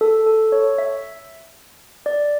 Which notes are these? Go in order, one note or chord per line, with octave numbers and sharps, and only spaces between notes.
A4
A4
C#5
E5
D5